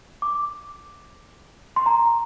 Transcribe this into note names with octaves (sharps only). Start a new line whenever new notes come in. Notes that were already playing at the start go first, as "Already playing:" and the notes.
D6
C6
A#5